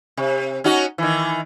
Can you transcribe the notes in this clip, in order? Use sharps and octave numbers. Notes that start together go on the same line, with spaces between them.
C3
C#4 D#4 F#4
D#3 E3